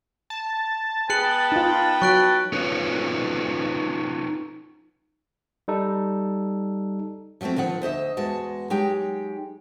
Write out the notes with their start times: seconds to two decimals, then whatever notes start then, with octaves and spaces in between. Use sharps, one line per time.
0.30 A5
1.10 B3 G#4 B4 G5 F#6 C#7 F#7
1.52 D#4 F4
2.02 F#3 C#6 F#6 D7
2.53 C#4 D#4 F4 A4 B4 C#5
5.68 G3 D#4 A4
7.41 F3 F#3 G#3 A3 C4
7.56 D3 D#3 F3 F#5
7.82 D2 C5 D#5 E5
8.17 E2 G#3 F#4 A5
8.70 F#3 G#3 D#4 G4 G5